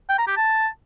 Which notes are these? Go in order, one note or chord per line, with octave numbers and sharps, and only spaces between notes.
G5
A#5
G4
A5